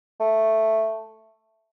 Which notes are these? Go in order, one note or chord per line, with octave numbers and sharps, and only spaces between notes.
A3